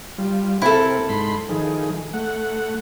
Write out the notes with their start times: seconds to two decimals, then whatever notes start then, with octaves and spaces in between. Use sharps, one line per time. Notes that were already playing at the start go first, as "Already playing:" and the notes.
0.18 G3 F4
0.62 C3 C4 E4 A4 A#4
1.09 G#2 B5 C6
1.49 D#3 F3 G#4
2.13 A3 F#5